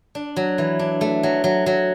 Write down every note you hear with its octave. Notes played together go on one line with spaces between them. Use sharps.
D4
F#3
E3
D4
A3
F#3
F#3
F#3